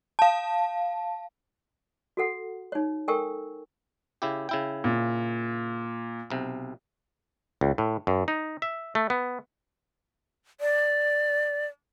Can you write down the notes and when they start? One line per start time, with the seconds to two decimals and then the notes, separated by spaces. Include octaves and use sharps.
0.19 F5 A5
2.17 F#4 A4 F#5
2.72 D#4 C#5
3.08 A4 A#4 G5 G#5 C#6 E6
4.22 C#3 E4 G4
4.49 C#3 E4 G5
4.84 A#2
6.30 B1 C3
7.61 C#2
7.78 A2
8.07 F#2
8.28 D#4
8.62 E5
8.95 A3
9.10 B3
10.61 D5